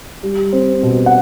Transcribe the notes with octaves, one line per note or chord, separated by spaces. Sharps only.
G3
C4
B2
F#5